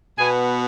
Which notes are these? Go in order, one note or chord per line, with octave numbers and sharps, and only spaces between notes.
B2 B3 G#5